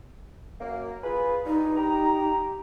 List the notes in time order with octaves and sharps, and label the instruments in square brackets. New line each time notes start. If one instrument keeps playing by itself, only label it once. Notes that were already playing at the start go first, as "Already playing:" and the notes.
[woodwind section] F#2 A#3
F4 G#4 B4
[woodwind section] G2 [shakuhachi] D#4
[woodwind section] G4 A#5